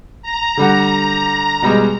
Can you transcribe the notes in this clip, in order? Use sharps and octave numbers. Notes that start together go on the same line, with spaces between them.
A#5
D3 G3 F#5
B2 G3 G#3